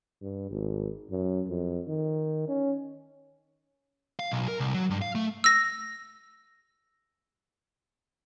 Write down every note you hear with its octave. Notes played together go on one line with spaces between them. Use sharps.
G2
G#1
F#2
F2
D#3
C#4
F5
B1
A#4
C2
F#3
G2
F5
A3
E6 A#6